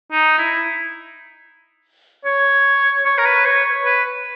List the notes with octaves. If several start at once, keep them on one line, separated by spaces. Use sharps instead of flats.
D#4
E4
C#5
C#5
A#4
B4
C#5
B4